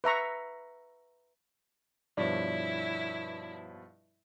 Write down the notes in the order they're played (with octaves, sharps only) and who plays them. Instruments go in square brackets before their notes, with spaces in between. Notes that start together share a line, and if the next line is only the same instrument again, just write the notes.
[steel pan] B4 E5 A#5 C#6
[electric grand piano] G2 B2 F3 [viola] E4 [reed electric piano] C#5 D5